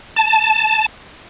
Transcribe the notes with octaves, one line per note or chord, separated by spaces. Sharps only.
A5